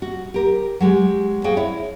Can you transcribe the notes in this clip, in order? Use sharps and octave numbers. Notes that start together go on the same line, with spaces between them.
F#4
G4 A#4
F#3 G#3 G4
F#4 G#4 C5 F5 G5
E4 C#5